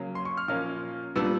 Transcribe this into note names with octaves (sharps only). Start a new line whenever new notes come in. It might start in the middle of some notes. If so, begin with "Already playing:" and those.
Already playing: C#3 F#3 A#3
C6
C#6
F6
A#2 F3 A#3 C#4 F6
A#2 G3 B3 D4 E6